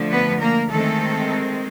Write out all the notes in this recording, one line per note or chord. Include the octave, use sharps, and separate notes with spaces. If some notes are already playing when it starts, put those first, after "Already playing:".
Already playing: D3 F3 A3
B3 B4
A#3 A#4
D#3 G#3 A3 C4 A4